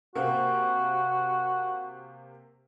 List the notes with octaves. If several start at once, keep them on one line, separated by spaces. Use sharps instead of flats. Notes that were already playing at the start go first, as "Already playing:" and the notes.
C3 A#3 F#4